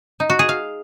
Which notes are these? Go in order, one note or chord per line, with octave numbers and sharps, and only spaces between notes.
D#4
F#4
G#4
F5